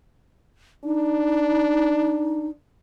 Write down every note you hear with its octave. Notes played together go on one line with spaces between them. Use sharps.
D4 D#4